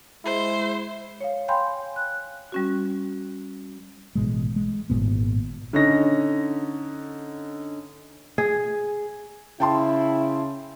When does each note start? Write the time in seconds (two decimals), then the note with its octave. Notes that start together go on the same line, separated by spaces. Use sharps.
0.25 G#3 E4 C5
1.20 C#5 F5
1.48 F5 G5 G#5 B5 C6 G6
1.96 F#6
2.52 G3 C#4 F#4
4.15 A1 B2 G#3
4.56 G#3
4.90 G#1 A#2 B3
5.73 D3 C#4 D#4 A#6
8.38 G#4
9.60 C#3 E4 G5 A5 C6